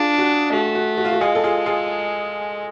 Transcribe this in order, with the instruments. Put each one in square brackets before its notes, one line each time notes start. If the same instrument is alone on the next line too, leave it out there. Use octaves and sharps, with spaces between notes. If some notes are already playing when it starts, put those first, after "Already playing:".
Already playing: [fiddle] D4 [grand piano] F4 G#4
[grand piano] F#4
[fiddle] A3 [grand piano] F#4
[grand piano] F#4
F#4
F4
F#4
[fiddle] G#3 [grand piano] F4 G#4
[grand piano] A4
F4 G#4
F4 G#4